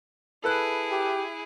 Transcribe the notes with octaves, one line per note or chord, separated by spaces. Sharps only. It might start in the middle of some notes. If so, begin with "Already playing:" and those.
E4 G#4 A4 B4 F#6
G4